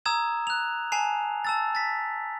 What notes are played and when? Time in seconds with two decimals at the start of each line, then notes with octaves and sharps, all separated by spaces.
0.06 A#5 D#6 E6 G#6 E7
0.47 F#6 F7
0.92 G#5 A5 C7 F7
1.45 A5 E6 A6
1.75 A6 B6